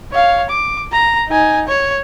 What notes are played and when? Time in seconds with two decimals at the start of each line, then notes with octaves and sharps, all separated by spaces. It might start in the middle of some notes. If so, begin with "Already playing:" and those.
0.12 C#5 F5
0.50 D6
0.92 A#5
1.29 D#4 G#5
1.68 C#5